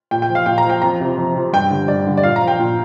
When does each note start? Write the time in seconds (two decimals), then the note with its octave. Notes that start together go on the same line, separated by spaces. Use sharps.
0.11 A#2 G5
0.22 G5
0.29 F3
0.35 F5
0.46 A#2 G5
0.58 A#5
0.65 F3 G5
0.82 F2 A#5
1.00 C3 F3
1.18 F2
1.35 C3 F3
1.53 G2 G5
1.71 D3 G3
1.88 G2 D5
2.07 D3 G3
2.17 D5
2.23 A#2 F5
2.36 A#5
2.42 F3
2.48 G5
2.59 A#2